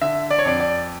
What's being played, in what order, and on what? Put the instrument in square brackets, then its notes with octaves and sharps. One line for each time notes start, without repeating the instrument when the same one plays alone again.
[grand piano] D3 E5
D5
C#5
F2 D5
D5